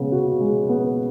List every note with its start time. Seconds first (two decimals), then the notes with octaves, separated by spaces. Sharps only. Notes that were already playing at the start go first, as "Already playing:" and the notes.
Already playing: C#3 G#3 B3
0.12 F#4
0.40 G#3
0.69 B3